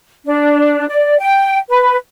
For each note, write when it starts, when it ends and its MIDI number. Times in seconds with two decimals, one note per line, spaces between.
0.25 0.86 62
0.88 1.16 74
1.20 1.58 79
1.69 1.95 71